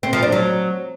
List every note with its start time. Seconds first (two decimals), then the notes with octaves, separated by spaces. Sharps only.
0.03 C4
0.13 F3
0.23 D4
0.32 F#3